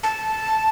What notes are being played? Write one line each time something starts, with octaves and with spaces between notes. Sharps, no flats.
A5